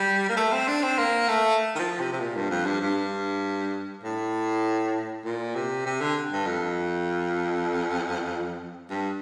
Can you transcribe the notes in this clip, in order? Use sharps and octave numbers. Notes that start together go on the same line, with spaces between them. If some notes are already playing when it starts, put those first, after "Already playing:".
Already playing: G3
A#3
A3
C4
D4
C4
A#3
A3
D#3
F3
C3
C3
A#2
G2
F2
G2
G2
A2
A#2
C3
C3
D3
G2
F2
G2